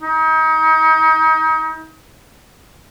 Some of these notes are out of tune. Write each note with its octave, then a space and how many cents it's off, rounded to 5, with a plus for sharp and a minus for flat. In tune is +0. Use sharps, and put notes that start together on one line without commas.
D#4 +35